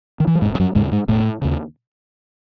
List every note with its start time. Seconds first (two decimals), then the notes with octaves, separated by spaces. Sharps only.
0.20 D#3
0.27 E3
0.35 F#3
0.42 E1 G#2 G#3
0.59 F#2 F#3
0.75 D#2 G#2 C#3 G#3
0.92 G#2 G#3
1.08 E1 A2 A3
1.42 D#2 C#3